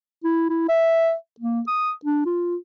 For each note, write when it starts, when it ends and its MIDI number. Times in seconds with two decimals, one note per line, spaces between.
0.24 0.47 64
0.50 0.68 64
0.69 1.14 76
1.40 1.61 58
1.67 1.92 87
2.05 2.24 62
2.26 2.56 65